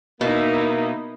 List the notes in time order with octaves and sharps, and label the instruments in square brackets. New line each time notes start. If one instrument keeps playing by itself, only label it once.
[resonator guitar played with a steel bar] B2 [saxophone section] A#3 [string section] D#4 E4